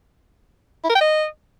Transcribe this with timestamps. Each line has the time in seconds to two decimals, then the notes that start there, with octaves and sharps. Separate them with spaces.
0.84 E4
0.90 A#4
0.95 G5
1.01 D#5